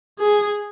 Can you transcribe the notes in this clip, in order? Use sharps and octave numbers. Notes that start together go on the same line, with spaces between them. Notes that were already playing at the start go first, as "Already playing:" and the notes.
G#4